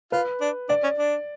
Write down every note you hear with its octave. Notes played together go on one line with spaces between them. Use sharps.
F4 B4
D4
D4 D5
C#4
D4